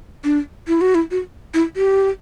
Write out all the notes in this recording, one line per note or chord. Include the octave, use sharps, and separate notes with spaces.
D4
E4
F#4
E4
F#4
E4
G4